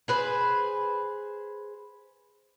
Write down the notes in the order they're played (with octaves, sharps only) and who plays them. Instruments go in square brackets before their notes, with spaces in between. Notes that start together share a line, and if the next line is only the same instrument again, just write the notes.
[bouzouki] G#4 B4 C5